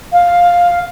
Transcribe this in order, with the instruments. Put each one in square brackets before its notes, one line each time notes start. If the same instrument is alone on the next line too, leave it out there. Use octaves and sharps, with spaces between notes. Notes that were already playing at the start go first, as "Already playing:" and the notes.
[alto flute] F5